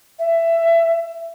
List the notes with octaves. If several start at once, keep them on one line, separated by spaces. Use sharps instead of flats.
E5